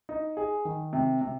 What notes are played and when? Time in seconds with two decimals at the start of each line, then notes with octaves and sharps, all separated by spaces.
0.09 D#4
0.37 G#4
0.65 D#3
0.93 C3
1.21 C3